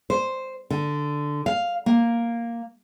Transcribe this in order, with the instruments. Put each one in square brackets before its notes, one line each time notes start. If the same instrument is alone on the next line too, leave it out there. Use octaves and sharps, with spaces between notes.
[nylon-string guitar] C5
D3
F5
A#3